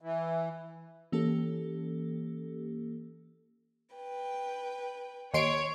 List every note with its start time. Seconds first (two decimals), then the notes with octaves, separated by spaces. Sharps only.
0.01 E3
1.12 E3 A#3 C#4 G4 A4
3.95 B4 G5
5.34 D#2 C#5 C6 D7